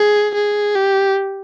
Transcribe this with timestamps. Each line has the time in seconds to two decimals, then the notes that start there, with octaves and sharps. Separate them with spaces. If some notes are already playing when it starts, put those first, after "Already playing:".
Already playing: G#4
0.34 G#4
0.75 G4